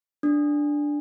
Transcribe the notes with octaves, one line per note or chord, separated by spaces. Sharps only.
D4